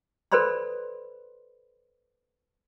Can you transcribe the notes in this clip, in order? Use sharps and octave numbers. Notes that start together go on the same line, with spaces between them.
A4 B4 C5 D5 B5 C6